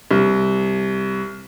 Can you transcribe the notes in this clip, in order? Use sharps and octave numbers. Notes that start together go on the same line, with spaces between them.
C2